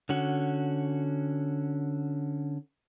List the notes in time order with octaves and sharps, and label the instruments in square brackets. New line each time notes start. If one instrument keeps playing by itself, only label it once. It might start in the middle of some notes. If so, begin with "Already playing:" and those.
[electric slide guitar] D3 C#4 F#4